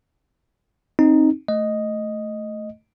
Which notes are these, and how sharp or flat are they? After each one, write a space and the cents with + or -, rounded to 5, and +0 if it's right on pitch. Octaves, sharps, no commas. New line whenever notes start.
C4 +25 D#4 +0
A3 +0 D#5 +0